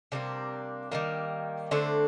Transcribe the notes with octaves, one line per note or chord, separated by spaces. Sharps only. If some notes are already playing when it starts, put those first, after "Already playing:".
C3 G3 A#3 D4
D#3 G3 A#3
D3 A3 C4 D4